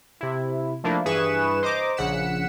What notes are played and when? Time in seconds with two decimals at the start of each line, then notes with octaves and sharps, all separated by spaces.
0.21 C3 E4
0.84 F3 A3 A#3 D4 E4
1.05 G2 E3 G#4 B4 C#6 E7
1.63 C5 D#5 A#5 D6
1.97 A#1 C#3 F#5 B6 C#7 E7